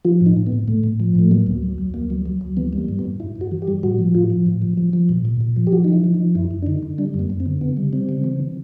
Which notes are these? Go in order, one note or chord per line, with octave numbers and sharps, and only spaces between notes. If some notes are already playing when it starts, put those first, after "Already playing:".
F3 F4
A2
D#4
A2
B3
A2
A2 A3
A2
F3
A2 A3
F#3 A#3
D2
F#3
D2
D2 A#3
F#3
F#3
D2
E3 B3
G3
A#3
G2
B3
G2
G2 E4
G2
F#4
E3
G4
G3
A2 F#4
F3
A2 F4
F3
A2
F3
F3
F3
A#2
A#2
A#2
F3
G4
F3 F#4
F3 D#4
E4
F3
D#4
F3
F#2 E4
F#2
D4
D3 D#4
D3
G3 D4
F#2 A#3
F#2
C4
D3
C#3 B3
G3
G3 C4
C#3
E3